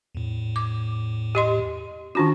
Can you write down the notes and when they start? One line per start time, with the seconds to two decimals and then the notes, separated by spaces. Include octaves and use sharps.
0.15 E2 A2
0.56 D6
1.35 G4 D#5 C6
2.15 D#3 C#4 D4 F4 F#4 A5